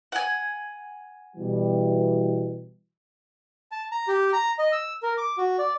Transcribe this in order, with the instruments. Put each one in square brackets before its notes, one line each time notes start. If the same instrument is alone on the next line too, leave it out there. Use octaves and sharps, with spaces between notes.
[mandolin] F#5 G#5
[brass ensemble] B2 E3 G3
[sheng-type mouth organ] A5
A#5
G4
A#5
D#5
E6
A#4
D6
F#4
D5